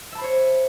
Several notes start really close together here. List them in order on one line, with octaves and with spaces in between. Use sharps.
E5 A5 B5 C5 C#5